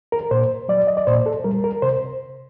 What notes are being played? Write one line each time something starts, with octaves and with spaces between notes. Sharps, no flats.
A#4
A#2 C5
F#3 D5
D#5
D5
A#2 C5
A4
G3 A#4
A#4
C3 C5